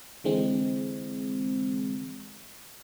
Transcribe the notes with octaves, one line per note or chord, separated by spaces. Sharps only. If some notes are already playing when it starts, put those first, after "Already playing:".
D3 E3 G#3 C4